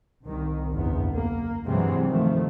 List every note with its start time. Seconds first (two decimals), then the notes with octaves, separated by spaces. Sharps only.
0.23 C2 D#3
0.72 F#1 E2 G2 B3
1.13 A#3
1.66 G2 C3 E3 F#3 G#3 C4
2.07 D#3 F3 A3